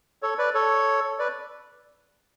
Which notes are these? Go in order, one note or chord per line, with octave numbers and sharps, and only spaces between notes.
A4 C#5
B4 D5
A4 C#5
B4 D5